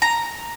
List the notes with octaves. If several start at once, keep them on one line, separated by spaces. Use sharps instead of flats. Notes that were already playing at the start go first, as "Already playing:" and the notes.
A#5